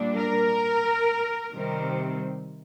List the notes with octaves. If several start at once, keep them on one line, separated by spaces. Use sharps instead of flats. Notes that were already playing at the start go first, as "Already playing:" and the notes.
Already playing: A#2 G3 D4
A#4
C3 D#3 G3 C4